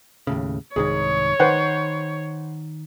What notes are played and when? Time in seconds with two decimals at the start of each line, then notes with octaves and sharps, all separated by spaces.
0.27 D#2 A2 C#3
0.76 C2 G#2 D#3 G#4 C#5
1.40 D#3 B4 C5 F#5